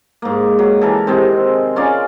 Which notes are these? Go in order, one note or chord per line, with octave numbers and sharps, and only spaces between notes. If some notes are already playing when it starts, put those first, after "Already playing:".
G#2 A#3
F#3
E3 A4 A#4
C3 D#3 G#3 C4
C#4 F4 A#4 D5